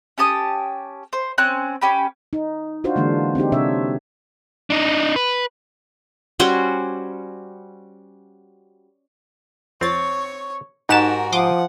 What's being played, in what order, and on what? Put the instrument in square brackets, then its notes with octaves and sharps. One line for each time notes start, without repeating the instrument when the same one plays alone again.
[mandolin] C#4 G4 A5 D#6
C5
C4 C#4 C5 F#6
C#4 G4 B5
[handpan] D#4
D4 F4 F#4 C5
D3 E3 G#3 A#3 D4
C4 D4 D#4 G4
C3 D4 C#5 E5
[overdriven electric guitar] D4 D#4
B4
[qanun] G3 C#4 F#4 C5
[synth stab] F2 A6 [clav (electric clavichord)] C4 [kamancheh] C#5 C#6
[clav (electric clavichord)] G#2 G4 A5 [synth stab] D#4 F#5 E7 [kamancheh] F#4 A#4
[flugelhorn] F3 [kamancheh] F#5 [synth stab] C6 D6 D#6